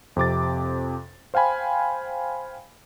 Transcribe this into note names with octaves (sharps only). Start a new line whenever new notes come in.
F2 C3 D6 A6
C5 F5 G5 G#5 B5